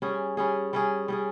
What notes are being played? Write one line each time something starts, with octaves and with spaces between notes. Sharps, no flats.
G3 C#4 G#4
G3 C#4 G#4
G3 C#4 G#4
G3 C#4 G#4